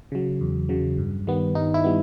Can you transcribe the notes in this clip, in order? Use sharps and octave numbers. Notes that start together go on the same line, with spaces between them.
C#3 F#3
E2
C#3 F#3
G2
D#3 G3 B3
G2 D#4
E4
G3 B3